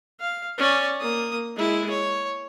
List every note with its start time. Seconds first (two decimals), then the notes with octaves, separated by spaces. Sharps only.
0.20 F5
0.58 C#4 D5
1.01 A#3 D#6
1.55 G#3 E4
1.90 C#5